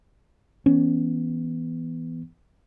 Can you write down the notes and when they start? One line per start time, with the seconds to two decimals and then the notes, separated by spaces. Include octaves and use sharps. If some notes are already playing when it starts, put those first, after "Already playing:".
0.66 E3 B3 C#4